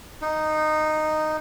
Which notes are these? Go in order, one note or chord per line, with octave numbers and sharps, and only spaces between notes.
D#4